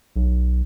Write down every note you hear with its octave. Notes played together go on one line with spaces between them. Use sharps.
B1